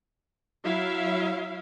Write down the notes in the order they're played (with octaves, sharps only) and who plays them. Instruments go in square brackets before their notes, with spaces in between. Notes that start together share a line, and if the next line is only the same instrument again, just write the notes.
[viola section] F#3 E4 E5 F5